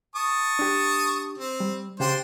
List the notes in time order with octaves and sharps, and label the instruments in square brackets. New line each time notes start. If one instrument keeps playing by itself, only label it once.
[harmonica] A5 C#6 D#6
[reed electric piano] D4 G4
[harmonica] C4
[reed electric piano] G3
[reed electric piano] C#3 G4 G5 [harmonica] D4 C5 C6